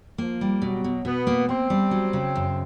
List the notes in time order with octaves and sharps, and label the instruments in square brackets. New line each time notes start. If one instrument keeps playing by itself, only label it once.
[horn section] F3 [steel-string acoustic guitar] A#3
[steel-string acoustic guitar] G3
[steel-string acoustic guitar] B2 [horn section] F#3
[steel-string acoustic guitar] B2
[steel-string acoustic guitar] B2 [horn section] B3
[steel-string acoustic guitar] A#3
[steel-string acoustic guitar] A#3 [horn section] C4
[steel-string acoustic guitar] G3
F#3
C#3
F#2